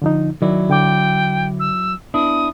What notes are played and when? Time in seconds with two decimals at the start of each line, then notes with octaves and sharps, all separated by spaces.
0.02 D3 F3 D#4
0.42 D#3 F#3 E4 D5
0.70 D3 G5 D6
1.60 E6
2.14 B3 D4 E4 D#6